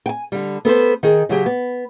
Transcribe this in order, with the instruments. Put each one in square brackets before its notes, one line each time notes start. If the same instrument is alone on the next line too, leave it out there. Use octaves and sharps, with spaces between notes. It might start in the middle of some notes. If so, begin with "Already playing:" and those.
[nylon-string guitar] G5 G#5
D3 G3
B3 A4 B4 C5
D#3 G#4
C#3 F#3 G4 G#4
B3